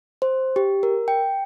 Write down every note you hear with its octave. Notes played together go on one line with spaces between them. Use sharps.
C5
G4
A#4
G5